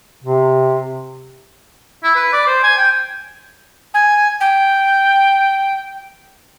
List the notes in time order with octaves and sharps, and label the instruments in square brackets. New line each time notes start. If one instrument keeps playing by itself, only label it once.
[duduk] C3
[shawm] E4
B4
D5
C5
G#5
G5
[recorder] G#5
G5